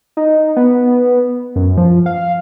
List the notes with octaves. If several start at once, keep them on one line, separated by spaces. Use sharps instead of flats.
D#4
B3
F#2
F3
F5